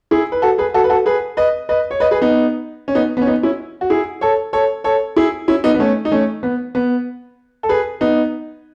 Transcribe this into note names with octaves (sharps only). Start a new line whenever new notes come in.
E4 G#4
B4
F#4 A4
G#4 B4
F#4 A4
B4
F#4 A4
G#4 B4
B4 D#5
B4 D#5
C#5
B4 D#5
G#4 B4
B3 D#4
C#4
B3 D#4
B3
C#4
B3 D#4
C#4 E4
F#4
E4 G#4
A4 C#5
A4 C#5
A4 C#5
E4 G#4
C#4 E4
B3 D#4
B3
A3 C#4
D#4
A3 C#4
B3
B3
A4
G#4 B4
B3 D#4